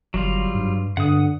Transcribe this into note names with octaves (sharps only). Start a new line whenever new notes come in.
G1 F#3 G3 F4
G2
G2 D3 F#5 D#6